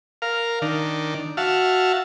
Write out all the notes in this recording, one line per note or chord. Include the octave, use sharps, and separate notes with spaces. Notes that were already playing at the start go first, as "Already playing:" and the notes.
A#4 F5
D#3 D4
F#4 E5 F5 A5